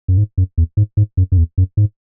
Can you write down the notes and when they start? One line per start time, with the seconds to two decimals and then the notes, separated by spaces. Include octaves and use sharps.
0.08 F#2
0.17 G#2
0.38 F#2
0.58 E2
0.77 G#2
0.97 G#2
1.17 F#2
1.32 F#2
1.38 E2
1.58 F#2
1.77 G#2